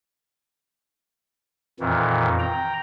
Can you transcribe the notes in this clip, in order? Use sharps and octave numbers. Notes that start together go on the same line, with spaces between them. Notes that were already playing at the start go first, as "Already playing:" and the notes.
F2 A#2 D#3 E3
G5 A#5